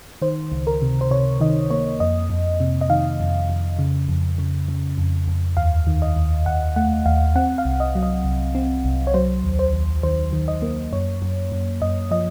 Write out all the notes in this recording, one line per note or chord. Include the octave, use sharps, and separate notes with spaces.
D#3 C5
C#2
A#4
C3
C5
C3 C#5
D#3 D#5
A#3 C#5
F2 D#5
F2
C3
D#5
D#3 F5
F2
F2
C#3
F2
C#3
C#3
F2
F2
D#2 F5
D#3
D#5
D#2
D#2 F#5
A3 F#5
D#2 F5
C4 F#5
F5
C2
D#5
F#3
D#5
C2
C4
C2
C#5
F#3 C5
D#2
C5
D#2
D#3 C5
D#3
D#5
A#3
F#2 C#5
F#2
F#2
F#2 D#5
F3 D#5